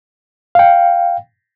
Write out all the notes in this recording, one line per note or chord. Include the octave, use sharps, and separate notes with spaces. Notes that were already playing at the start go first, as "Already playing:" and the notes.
F5 G5